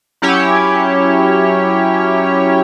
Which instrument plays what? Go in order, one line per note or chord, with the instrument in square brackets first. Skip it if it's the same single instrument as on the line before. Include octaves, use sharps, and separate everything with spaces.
[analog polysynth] F#3 C#4 E4 G4 C#5